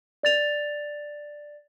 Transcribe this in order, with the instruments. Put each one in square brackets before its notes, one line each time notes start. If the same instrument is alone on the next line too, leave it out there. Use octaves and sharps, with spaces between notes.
[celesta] D5 A6 F7